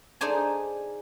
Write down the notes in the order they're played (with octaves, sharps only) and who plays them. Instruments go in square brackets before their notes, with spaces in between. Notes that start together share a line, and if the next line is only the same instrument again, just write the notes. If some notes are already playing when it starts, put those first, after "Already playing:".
[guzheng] D#4 G#4 C5 D5 G#5 A5